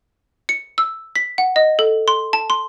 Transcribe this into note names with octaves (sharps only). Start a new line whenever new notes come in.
C#7
E6
B6
F#5
D#5
A4
C6
A5
C6